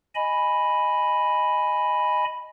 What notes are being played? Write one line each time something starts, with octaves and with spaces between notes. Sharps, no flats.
D#5 G#5 B5